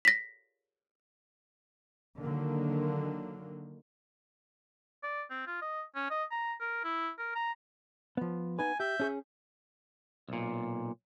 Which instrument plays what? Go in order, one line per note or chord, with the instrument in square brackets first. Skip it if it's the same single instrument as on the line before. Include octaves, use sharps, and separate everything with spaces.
[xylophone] A#6 B6
[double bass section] D3 D#3 F#3 A#3
[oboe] D5
C4
F4
D#5
C#4
D#5
A#5
A#4
E4
A#4
A#5
[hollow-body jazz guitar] F3 B3
[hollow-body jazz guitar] B3 D#4 B4 [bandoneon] G#5
[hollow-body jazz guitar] G4 [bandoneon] E5 G6
[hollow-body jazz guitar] C#4 G#4 C#5
[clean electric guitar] B1 A#2